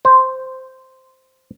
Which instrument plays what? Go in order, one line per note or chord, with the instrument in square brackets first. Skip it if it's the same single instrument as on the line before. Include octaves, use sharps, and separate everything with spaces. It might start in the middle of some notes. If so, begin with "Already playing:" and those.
[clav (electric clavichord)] C5